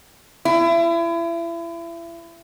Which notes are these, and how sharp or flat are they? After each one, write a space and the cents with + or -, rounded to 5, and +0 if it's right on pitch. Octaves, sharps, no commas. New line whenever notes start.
E4 +35